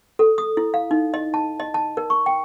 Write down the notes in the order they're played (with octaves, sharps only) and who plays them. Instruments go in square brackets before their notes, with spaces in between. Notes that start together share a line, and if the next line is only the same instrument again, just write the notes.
[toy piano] A4
D#6
E4
F5
D#4
D#5
A5
D#5
A5
A#4
C#6
G5